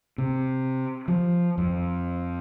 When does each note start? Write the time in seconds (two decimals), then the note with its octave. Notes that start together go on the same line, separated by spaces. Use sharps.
0.18 C3
1.08 F3
1.58 F2